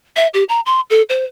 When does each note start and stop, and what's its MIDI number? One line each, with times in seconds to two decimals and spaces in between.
0.16 0.28 76
0.34 0.44 67
0.49 0.60 82
0.66 0.80 84
0.90 1.02 69
1.09 1.25 72